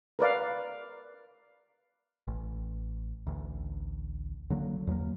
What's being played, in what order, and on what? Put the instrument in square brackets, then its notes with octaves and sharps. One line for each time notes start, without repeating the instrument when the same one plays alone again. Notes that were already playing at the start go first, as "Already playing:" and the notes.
[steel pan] A#4 B4 D5 F5
[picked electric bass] A1
A1 D2
D3 F#3 A#3
E2 F#3 A3 A#3